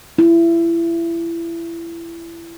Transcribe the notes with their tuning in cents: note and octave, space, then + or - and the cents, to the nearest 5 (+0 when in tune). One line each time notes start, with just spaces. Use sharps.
E4 +25